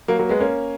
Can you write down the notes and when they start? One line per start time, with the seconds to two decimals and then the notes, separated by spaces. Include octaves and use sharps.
0.08 F#3 A#3
0.19 F#3 A#3
0.29 G#3 B3
0.40 A#3 C#4